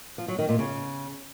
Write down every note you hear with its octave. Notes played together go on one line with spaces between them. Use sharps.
F3
F#3
D#3
A#2
C#3